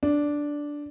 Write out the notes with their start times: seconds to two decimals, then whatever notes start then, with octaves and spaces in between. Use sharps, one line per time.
0.03 D4